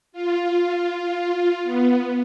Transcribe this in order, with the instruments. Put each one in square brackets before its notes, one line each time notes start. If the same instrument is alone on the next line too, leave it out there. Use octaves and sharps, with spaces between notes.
[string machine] F4
B3